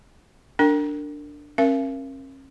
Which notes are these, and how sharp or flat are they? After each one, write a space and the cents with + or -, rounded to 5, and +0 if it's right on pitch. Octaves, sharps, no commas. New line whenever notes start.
D4 +0 A#4 -30 G5 +0
C#4 -40 A#4 +10 F5 -45